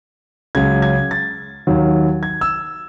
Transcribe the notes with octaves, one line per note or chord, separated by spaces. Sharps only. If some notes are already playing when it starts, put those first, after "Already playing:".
C#2 C#3 F#3 G#6
G#6
A6
D#2 D#3 F#3
G#6
E6